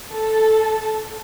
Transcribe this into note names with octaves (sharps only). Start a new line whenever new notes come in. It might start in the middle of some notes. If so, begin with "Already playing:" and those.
A4